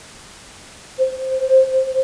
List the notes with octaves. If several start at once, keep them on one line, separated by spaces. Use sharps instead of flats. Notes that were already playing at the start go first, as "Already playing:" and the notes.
C5